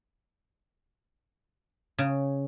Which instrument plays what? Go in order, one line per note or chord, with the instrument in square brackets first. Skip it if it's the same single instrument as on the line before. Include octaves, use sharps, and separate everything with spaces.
[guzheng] C#3